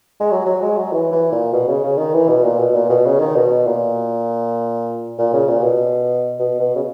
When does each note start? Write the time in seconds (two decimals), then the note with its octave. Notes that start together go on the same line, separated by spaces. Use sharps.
0.20 G#3
0.32 F#3
0.46 F#3
0.62 G#3
0.77 F#3
0.92 E3
1.12 E3
1.32 A#2
1.53 B2
1.68 C#3
1.84 C#3
1.98 D#3
2.14 E3
2.28 B2
2.44 A#2
2.59 B2
2.75 A#2
2.90 B2
3.06 C#3
3.20 D#3
3.36 B2
3.67 A#2
5.18 A#2
5.33 C#3
5.49 A#2
5.63 B2
6.39 B2
6.60 B2
6.76 C#3